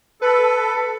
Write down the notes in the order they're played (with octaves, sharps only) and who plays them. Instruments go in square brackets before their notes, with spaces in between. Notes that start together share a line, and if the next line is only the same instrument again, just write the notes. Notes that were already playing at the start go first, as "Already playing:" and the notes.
[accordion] A4 [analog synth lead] B4